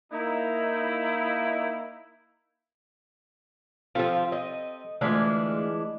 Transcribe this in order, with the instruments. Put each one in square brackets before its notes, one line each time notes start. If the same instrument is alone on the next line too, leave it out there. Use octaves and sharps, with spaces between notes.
[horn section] A#3 D#4 E4
[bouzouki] F3 F4 [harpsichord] C4 G4 A4
[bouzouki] D#5
[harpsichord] D2 F4 B5 [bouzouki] E3 G#3 D4